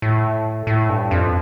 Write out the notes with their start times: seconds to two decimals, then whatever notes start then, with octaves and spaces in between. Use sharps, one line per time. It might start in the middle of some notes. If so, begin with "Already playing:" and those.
0.02 A2
0.67 A2
0.89 G2
1.11 F2